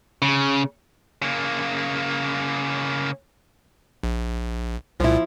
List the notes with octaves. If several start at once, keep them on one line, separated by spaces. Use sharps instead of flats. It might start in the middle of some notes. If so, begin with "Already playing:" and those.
C#3
C#3 A#3
A#1
C2 A#2 F3 E4